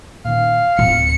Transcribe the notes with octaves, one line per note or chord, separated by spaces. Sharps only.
A#2 D#3 F5
D1 A2 G3 C#7